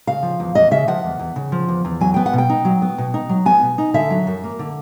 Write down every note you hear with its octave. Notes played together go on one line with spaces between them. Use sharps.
C#3 F5
F3
E2
E2 D#5
C#3 E5
F3 F#5
E2
E2
C#3
F3
E2
E2
F#3 G#5
B3 G5
F#5
B2
G5
D#4
F#3
B3
B2
D#4
F#3
B3 G#5
B2
D#4
D3 E5
F#3
F#2
A#3
D3